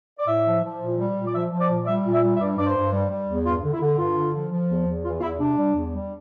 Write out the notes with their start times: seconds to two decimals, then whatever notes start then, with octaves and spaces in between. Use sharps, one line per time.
0.19 D5
0.28 A2 E5
0.46 F3
0.64 F3
0.81 A#2
0.98 G3
1.16 A#2
1.27 D5
1.34 F3 E5
1.52 F3
1.60 D5
1.69 A#2
1.83 D5
1.87 G3 E5
2.04 A#2
2.13 E5
2.22 G3
2.36 E5
2.40 G2 D5
2.57 G2 D5
2.67 C5
2.76 G2
2.92 G3
3.10 G3
3.28 E2
3.45 G2 F4
3.64 D3
3.73 E4
3.81 D3
3.98 G2 F4
4.16 D3
4.34 F3
4.51 F3
4.69 E2
4.87 E2
5.05 E3 F4
5.18 F4
5.22 E2 E4
5.39 C3 D4
5.57 G3
5.75 E2
5.92 G3